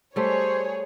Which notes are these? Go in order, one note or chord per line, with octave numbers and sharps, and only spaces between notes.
G3 A3 G#4 C5 C#5